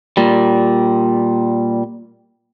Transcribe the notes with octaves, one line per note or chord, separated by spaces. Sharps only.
A#2 G3